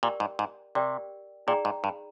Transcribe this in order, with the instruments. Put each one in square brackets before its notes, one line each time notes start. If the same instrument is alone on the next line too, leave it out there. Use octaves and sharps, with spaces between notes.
[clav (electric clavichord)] A#2 [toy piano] G4 A#4 D5 G5
[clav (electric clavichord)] G#2
G#2
[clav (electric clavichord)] C3 [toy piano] G4 A#4 D5 G5
[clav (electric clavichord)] A#2 [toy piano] D#4 G#4 D5 G5 A#5
[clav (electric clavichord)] G#2
G2